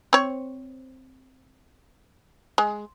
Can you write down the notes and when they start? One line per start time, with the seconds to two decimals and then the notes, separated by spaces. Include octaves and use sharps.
0.13 C4 C#5
2.58 G#3